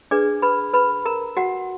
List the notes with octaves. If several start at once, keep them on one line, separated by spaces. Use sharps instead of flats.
D4 G#4 B4 D5 D6
B4 B5
B4 B5
A#4 A#5
F#4 F#5